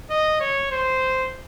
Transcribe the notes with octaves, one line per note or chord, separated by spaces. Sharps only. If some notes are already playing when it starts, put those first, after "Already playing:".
D#5
C#5
C5